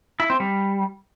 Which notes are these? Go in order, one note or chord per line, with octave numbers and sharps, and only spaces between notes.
E4
C4
G3